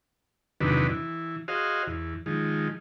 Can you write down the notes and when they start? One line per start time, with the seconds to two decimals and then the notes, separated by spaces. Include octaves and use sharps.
0.61 E2 C3 D#3 F#3 D4 B4
0.89 E3
1.48 F#4 G#4 C5 D#5 F5
1.87 E2
2.26 D#3 F3 G#3